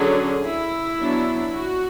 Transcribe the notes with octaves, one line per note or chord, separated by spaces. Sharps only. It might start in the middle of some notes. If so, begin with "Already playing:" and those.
Already playing: D3 F#3 C#4 G#4
E4
F#3 B3 D4
F#4